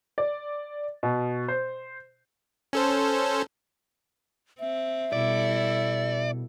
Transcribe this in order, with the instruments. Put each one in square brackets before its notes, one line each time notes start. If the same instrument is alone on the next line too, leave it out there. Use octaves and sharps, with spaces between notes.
[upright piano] D5
B2
C5
[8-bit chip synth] C#4 A4 C5
[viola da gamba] C4 [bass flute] E5
[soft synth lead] B2 [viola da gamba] G3 E4 A4 [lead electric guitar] D5